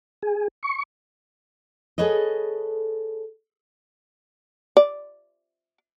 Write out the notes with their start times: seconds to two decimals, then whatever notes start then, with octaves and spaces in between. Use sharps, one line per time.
0.23 G#4
0.63 C#6
1.98 G#4 A4 B4 C#5 D#5
4.77 D5